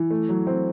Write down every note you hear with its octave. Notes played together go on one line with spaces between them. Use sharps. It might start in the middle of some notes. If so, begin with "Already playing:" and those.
Already playing: E3
A3
F#3
C4